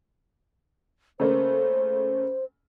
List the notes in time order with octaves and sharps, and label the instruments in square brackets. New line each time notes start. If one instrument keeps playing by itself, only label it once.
[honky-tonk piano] C#3 A3 A#3 [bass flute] C5